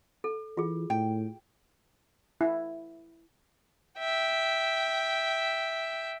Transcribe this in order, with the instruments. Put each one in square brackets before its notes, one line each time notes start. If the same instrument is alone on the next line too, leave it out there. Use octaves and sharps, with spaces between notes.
[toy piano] A4
[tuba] E3 [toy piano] F4 G#4
[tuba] A2 [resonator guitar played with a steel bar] G5
[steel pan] E4
[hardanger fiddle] E5 G5